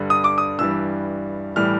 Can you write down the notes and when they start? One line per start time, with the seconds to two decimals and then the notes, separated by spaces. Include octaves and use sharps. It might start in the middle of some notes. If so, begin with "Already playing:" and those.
Already playing: G2 D3 G3
0.10 D#6
0.24 D6
0.38 D#6
0.59 G2 E3 G3 E6
1.56 A2 E3 G3 F6